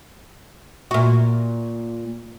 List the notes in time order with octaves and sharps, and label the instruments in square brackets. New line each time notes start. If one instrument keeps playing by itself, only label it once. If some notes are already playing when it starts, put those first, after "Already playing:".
[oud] A#2 F#4